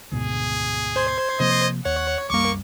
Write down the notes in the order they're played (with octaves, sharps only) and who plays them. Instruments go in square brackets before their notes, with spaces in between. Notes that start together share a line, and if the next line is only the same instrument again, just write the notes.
[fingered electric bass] D2 G#2 B2 [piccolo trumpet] G#4
[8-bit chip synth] C5 C6 G#6
[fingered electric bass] C3 F3 A#3 [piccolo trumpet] D#5
[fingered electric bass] D#2 [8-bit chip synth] C#5 [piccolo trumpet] F#5
[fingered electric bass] C2 F#2 G3 [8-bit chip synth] A#3 D6 [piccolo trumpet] C#6